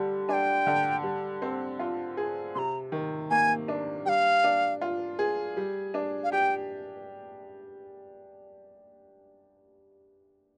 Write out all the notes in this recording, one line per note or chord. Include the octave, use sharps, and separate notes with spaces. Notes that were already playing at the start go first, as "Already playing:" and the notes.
Already playing: D3 G3
D4 G5 G#5
D3
G3
C4
F4
G#4
C3 A#5 C6
D#3
A#3 G#5
D4
G3 F5 G5
D4
F4
G#4
G3
D4
F5
G4 G5